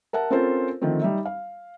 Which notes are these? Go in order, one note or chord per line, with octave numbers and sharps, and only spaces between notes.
A#4 E5 F#5 A5
C4 C#4 F4 A4 A#4 C5
D3 D#3 F3 A3 C4
G3 D#4 E5
F5